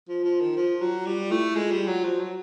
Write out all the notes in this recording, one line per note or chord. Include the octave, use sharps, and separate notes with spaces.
F3 F4
F3
D#3
F3
F#3
G3 F4
A3 E4
G#3 F4
G3
F4
F#3
F3 F#4
F#3